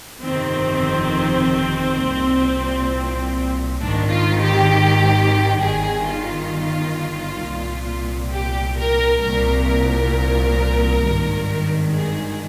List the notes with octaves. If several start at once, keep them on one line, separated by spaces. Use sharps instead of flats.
G1 F2 C3 D#3 C4
C2 A#2
G#1 G#2 D#3 D4
F4
G4
G1 G2 D#3 G#4
F4
C2 A#2
G4
A#4
C2 A#2 A#4
A#4
G#1 G2 D#3
G#4